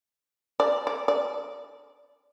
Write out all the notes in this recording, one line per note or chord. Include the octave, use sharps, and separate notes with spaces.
D5
D5
D5